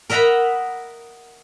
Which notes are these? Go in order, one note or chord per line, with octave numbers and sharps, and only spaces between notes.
A#4 D#5 E5 F#5 A#5 B5